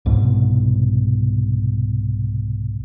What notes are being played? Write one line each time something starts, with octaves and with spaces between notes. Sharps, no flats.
C2 G#2 B2